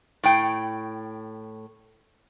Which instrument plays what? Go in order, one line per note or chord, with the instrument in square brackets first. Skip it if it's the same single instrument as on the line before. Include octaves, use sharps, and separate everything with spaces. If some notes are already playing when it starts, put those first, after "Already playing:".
[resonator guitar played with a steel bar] A2 G5